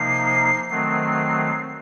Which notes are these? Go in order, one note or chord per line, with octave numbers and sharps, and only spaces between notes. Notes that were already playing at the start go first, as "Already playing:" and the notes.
Already playing: C3 F3 A#3 D#4 C7
D#3 F#3 A3 C4 C7